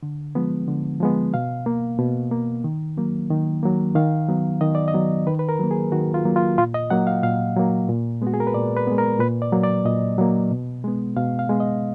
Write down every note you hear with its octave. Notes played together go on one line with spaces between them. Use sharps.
D3
F3 G#3 B3
D3
F3 G#3 B3
B2 F5
A#3
B2
A#3
D#3
F#3 A#3
D#3
F#3 A#3
D#3 F5
F#3 B3
D#3 D#5
D5
D#5
F#3 B3
D#3 B4
B4
A#4
F#3 A#3
G#4
D#3 F#4
F4
F#3 A#3
F4
A#2 F4
D#5
F#3 A#3 F#5
F5
A#2 F5
F#3 A#3
A#2
G#3 B3 F#4
G#4
A#4
B4
A#2 D5
B4
G#3 B3
A#4
A#2 B4
D5
F#3 A#3
D5
A#2 D#5
F#3 A#3
B2
G#3 B3
B2 F5
F5
G#3 B3
D#5